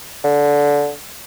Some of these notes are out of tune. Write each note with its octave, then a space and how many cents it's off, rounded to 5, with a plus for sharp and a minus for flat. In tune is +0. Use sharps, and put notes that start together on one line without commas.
D3 -15